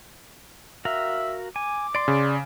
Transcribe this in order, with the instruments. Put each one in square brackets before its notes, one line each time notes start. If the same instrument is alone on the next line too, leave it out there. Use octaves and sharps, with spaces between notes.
[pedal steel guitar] F#4 A#4 F5 [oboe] E5
[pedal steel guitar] G#5 [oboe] D6
[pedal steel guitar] D5 C6 [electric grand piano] D7
[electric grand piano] C#3